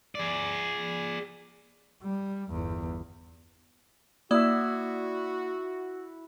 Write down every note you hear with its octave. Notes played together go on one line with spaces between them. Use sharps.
G#4 D5
G3
G1 E2
A#3 E4 F#4 D5 E5 D#6